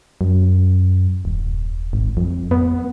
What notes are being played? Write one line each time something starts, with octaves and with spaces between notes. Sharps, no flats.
F#2
D#1
G#1
F2
B3